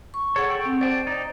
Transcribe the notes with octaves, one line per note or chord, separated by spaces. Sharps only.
C#6
G#4 A4 C#5 F#5
A4 G5 C#6
C4
C5 D5 G5 A5
D#4 D5